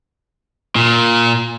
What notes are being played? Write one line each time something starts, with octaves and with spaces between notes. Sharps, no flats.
A#2